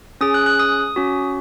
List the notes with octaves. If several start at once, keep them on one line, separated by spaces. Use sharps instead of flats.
C#4 G#4 D#6
F#6
F#6
D#6
C#4 F#4